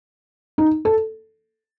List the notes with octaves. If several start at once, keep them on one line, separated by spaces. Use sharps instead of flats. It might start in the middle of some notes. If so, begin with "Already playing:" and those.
D#4
A4